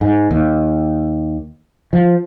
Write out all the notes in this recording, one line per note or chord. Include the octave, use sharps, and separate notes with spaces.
G#2
D#2
F3